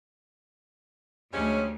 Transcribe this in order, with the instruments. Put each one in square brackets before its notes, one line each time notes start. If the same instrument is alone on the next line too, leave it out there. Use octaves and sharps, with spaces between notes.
[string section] D2 [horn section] G3 G#3 C#4